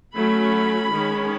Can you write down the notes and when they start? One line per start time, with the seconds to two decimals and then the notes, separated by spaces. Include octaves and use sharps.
0.15 F#3 A3 C#4 B5
0.93 D#3 G#3 C#4